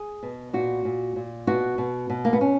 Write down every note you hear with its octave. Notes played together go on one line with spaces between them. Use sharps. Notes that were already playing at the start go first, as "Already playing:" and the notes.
Already playing: G#4
B2
A#2 F#4
A#2
A#2
B2 F#4
B2
B2
A#3
B3
B2 C#4